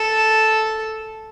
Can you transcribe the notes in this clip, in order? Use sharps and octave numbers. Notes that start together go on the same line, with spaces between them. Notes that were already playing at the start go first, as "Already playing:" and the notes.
Already playing: A4